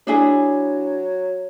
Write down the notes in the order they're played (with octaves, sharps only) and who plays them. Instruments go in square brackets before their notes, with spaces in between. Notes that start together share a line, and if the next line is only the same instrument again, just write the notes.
[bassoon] F#3 [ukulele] D4 E4 G#4